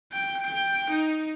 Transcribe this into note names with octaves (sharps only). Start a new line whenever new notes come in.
G5
G5
D#4